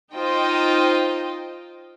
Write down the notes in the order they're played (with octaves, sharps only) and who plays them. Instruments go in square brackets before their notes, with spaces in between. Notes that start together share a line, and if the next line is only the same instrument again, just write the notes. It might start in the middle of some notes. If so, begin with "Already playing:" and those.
[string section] D#4 F4 C5 D#5 G5